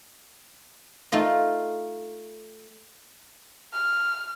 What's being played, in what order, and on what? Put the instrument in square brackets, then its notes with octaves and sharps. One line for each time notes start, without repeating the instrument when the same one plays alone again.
[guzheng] A3 D#4 F4 D#5
[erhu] F6